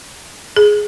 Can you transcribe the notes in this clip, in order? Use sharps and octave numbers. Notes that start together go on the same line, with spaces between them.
G#4